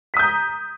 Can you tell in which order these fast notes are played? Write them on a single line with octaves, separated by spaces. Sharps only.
B6 D#6 G6 A#5